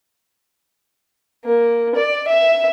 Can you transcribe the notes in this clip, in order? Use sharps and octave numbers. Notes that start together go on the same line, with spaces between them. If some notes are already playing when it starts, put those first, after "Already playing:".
A#3
D5
E5